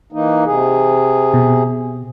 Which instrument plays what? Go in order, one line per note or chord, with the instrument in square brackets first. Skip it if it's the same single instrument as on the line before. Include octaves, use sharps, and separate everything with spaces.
[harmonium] E3 A#3 D#4
C3 G#4
[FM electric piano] B2